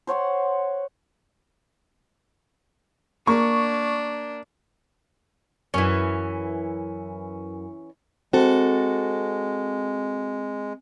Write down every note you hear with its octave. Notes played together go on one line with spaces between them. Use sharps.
C5 C#5 F#5 C6
A#3 D4 C#6
F#2 E3 C#4
G#3 C4 F#4 A4